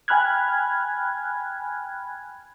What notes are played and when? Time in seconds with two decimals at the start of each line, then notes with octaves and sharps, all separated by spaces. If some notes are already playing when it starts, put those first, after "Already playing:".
0.08 G5 G#5 B5 F6 F#6 G#6